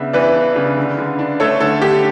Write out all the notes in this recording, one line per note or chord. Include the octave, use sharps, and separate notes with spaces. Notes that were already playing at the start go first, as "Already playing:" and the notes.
Already playing: C#3 B3 D4 E5
E3 B4 D5
D4
C#3
D3
D3
D4
A3 A4 C#5
D3 A4
D3 G4